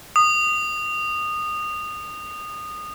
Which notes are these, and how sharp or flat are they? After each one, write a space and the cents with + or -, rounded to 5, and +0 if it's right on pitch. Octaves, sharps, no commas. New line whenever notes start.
D#6 -20